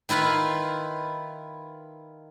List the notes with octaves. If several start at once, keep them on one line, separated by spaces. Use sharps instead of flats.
D#3 E4 F4 B4 F5